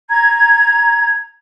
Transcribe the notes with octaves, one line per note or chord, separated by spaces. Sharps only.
A#5 G#6